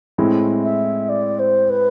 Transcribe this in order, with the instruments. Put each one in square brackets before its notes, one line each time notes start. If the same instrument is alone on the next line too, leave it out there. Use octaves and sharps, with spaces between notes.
[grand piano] A2 G#3 C4 E4
[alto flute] E5
D5
C5
B4